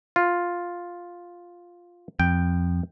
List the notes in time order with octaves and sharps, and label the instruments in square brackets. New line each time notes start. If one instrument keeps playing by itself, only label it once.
[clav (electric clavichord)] F4
[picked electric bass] F2 [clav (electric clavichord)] G5